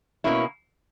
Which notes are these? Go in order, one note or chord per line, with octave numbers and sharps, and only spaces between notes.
B2 A#3 C#4 E4